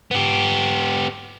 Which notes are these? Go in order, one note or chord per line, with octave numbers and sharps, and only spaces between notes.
B3 G4